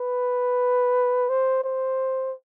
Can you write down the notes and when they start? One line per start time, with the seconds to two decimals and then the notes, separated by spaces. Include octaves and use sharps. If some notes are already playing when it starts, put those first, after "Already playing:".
Already playing: B4
1.29 C5
1.64 C5